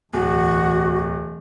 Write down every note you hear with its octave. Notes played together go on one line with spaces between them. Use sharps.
D1 E2 B2 F#4